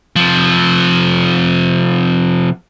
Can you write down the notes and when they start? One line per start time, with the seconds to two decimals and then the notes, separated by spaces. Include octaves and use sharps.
0.16 C3 F3